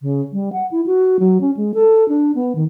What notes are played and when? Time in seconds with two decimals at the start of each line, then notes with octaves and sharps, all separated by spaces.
0.02 C#3
0.32 G3
0.53 F#5
0.71 E4
0.86 F#4
1.19 F#3
1.41 C#4
1.57 G#3
1.74 A4
2.08 D4
2.35 B3
2.55 D#3